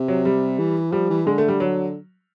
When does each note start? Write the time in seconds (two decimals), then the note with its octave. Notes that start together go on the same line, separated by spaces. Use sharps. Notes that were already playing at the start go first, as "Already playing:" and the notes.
Already playing: C3
0.08 F#3
0.25 G3
0.59 E3
0.92 F3 G3
1.10 E3
1.26 D3 G#3
1.38 A3
1.48 G3
1.60 F#3